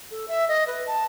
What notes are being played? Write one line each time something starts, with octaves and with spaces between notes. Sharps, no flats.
A4
E5
D#5
B4
A5